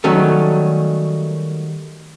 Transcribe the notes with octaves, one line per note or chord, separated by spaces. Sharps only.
D#3 F#3 G3 A3 C#4